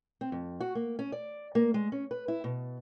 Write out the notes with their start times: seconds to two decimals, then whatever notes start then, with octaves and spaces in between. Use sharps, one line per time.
0.21 C4
0.32 F2
0.60 F#4
0.75 A#3
0.99 C#4
1.12 D5
1.55 A#3
1.74 G#3
1.92 C#4
2.11 B4
2.28 E4
2.44 B2